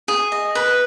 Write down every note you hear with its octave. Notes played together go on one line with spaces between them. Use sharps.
G#4
D#5
B4